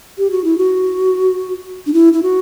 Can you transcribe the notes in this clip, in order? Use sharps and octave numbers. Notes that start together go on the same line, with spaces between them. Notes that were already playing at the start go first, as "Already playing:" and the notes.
G4
F#4
E4
F#4
D4
E4
E4
F#4